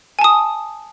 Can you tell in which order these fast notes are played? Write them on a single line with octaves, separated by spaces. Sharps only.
G#5 A5 D#6